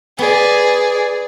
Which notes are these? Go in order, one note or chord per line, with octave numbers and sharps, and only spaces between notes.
B3 G#4 D5